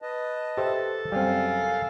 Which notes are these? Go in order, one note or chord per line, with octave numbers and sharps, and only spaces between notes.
B4 D#5 A5
G4 A4 C5 E5
F#2 G3 C4 F5 G#5